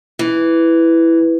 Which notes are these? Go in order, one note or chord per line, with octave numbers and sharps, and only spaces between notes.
E3